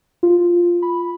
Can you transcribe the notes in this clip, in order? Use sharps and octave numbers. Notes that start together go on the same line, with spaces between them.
F4
B5